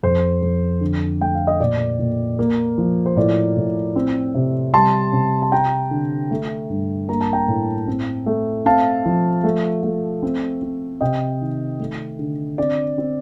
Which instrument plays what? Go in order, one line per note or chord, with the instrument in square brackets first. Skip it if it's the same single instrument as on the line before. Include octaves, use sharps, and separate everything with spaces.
[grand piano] F2 C5
F2
D3
A3 G5
F5
D#5
A#2 D5
A#2
A#3
F3
C5
A2 D5
A2
C4
C3
G3 A5 C6
C3
A5
C4 G5 A#5
D3
A3
G2
A#3 A#5
A5
G5 A#5
A2
C4
A3
C4 F5 A5
F3
A3
A3
C4
C4
C3 D#5 G5
D#3
A3
D3
C4 D5
C4